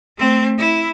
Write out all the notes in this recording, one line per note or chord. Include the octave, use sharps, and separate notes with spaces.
A3 C4
E4